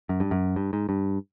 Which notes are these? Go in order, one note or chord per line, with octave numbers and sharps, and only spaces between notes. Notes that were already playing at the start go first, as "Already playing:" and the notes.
F#2
G2
F#2
G2
G#2
G2